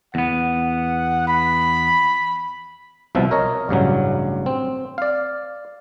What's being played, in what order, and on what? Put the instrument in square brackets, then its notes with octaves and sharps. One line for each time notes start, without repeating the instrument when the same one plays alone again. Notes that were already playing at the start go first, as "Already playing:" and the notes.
[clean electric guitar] E2 B3 [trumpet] F#5
[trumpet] B5
[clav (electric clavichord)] C2 B2 F3 E5
A#4 C#5 D#5
A1 G2 C#3 F#3
C4
D5 F5